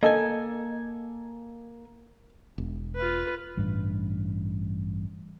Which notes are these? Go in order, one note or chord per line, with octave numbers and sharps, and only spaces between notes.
A#3 A4 D#5 G#5
E1
F4 B4
A1 G2